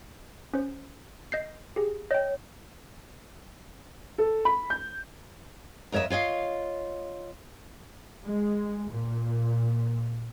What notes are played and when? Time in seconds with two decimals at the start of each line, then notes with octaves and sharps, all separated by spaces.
0.54 C#4 C5
1.32 D#5 G6 C7
1.76 G4 G#4
2.11 C#5 D#5 G5
4.18 A4
4.45 B5
4.70 G6
5.92 F2 A#4 C#5 D#5 E5
6.10 F4 C#5 D#5 F5
8.26 G#3
8.91 A#2